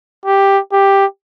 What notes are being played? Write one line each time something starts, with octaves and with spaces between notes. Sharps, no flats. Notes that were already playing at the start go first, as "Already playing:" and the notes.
G4
G4